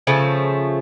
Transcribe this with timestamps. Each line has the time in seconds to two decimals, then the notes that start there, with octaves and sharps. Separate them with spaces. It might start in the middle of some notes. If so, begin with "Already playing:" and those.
0.07 C#3 F3 A3